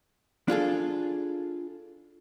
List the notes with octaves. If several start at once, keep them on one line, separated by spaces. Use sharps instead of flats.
D4 F4 G#4 A4